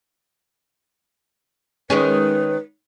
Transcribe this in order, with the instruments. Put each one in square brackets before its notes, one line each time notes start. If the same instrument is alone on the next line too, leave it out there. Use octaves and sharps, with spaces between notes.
[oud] D#3 G#3 C#4 [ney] B4